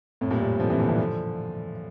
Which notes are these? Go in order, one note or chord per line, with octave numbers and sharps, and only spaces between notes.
F2 A2
G2 A#2
A2 C3
D3 F3
C3 E3
A#2 D3
C3 E3
D3 F3